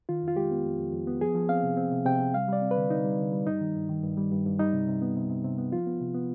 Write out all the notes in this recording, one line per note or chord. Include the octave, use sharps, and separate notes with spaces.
D#3 F4
F2
F4
G#3 G4
B3
F2
F2
F2
B3
F3 G#4
F3
C4 F5
C3
C4
C3
C3 G5
C3
G3 F5
G3 D5
C4
B4
D3
D3 D#4
G3
D3
G3
G2 D#4
D#3
G2
D#3
G2
G3
G2
G2
G3 D#4
C3
C3
B3
C3
C3
C3
B3
F3 F4
B3
C3
B3